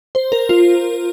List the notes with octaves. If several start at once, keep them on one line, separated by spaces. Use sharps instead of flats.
C5
A#4
F4